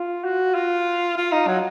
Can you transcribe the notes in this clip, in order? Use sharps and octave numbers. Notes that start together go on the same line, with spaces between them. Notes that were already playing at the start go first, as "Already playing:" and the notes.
Already playing: F4
F#4
F4
F4
D#4
F#3